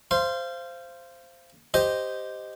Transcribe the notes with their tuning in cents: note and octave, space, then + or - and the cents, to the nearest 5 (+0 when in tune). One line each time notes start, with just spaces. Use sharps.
C5 +0 F5 -25 C6 +0
G4 +0 C5 -5 D#5 +0